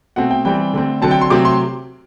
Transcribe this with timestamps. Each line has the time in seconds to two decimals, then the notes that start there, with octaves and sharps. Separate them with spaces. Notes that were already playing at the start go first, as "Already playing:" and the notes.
0.16 B2 A3 C4 F#5
0.31 G5
0.45 E3 G3 C4 G5
0.74 D3 A3 C4
1.02 D3 F#3 C4 A5
1.11 G5
1.21 C6
1.30 C3 F#3 A3 C4 D6
1.45 C6